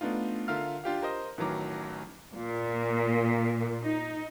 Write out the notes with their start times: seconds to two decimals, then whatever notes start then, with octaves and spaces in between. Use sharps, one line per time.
0.01 A3 B3 D4 D#4 F4
0.48 D3 F4 A#4 E5 F5 F6
0.84 D4 F4 G4 F5
1.02 A#4 C5 D#5
1.38 A1 D#3 E3 F#3 A#5 D6
2.35 A#2
3.82 D#4